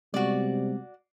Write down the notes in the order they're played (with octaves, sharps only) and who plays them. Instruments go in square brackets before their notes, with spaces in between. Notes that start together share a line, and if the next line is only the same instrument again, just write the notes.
[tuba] C3 [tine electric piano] G3 G#3 B3 [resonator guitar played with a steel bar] F#4 D5